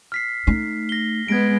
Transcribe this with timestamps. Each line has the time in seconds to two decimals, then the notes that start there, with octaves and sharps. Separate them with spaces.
0.12 F6 B6 C7
0.47 A3 D#4 C7
0.89 A#6 G7
1.28 G#3 B3 G#6 A#6 D7